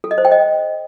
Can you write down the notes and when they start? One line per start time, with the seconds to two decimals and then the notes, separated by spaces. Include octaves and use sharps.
0.04 A4
0.11 D#5
0.18 C5
0.25 G5
0.31 D#5